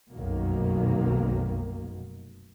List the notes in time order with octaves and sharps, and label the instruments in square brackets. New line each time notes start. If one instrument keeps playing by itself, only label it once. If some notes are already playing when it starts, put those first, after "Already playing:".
[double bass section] F1 B1 F#2 B2 D#3 A#3